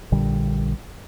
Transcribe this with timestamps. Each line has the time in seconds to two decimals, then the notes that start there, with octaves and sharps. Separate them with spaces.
0.12 A#1 A#2 D3 G3